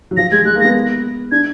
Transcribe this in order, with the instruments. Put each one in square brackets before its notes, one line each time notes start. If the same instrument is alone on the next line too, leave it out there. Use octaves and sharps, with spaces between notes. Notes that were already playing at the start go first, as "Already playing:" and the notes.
[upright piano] F#3
[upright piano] F3 [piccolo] A#6
[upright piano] G#3 [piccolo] G#6
[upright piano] G#3 [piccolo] F#6
[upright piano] A#3
[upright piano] B3 [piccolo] A#6
[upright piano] D4 [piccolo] G#6